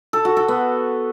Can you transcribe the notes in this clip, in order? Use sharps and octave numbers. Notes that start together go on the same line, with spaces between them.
A4
F#4
A4
B3